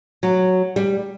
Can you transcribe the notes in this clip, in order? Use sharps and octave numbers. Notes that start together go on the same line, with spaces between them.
F#3
G3